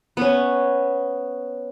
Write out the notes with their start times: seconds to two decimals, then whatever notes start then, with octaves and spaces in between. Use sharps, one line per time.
0.17 B3 C#4